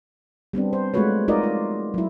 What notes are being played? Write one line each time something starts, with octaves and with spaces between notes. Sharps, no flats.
G3 B3 C4 D4
C5
G#3 A3 F4 F#4 B4 C#5
D#4 F4 F#4 A#4 D5 D#5
F4
F#3 E4